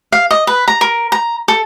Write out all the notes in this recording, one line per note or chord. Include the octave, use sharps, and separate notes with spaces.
F5
D#5
B4
A#5
A#4
A#5
A4